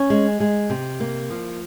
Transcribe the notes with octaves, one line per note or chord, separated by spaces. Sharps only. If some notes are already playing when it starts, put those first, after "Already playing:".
Already playing: C#4
G#3
G#3
C3
A#3
F3